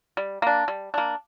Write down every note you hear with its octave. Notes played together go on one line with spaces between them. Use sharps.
G3
A#3 D4
G3
A#3 D4